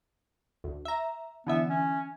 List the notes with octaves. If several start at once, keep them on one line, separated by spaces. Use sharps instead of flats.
D2
E5 A#5
D3 E3 B3 E5
C#4